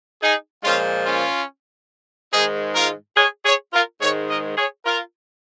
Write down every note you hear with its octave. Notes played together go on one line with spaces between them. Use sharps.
D#4 G#4
A#2 F3 G#3 C#4 F4
C#4 F4
G#2 D#3 G#3 D#4 G#4
F4 A#4
G#4 C#5
G#4 C#5
F4 A#4
G#2 D#3 G#3 G#4 C#5
A#4 D#5
G#4 C#5
F4 A#4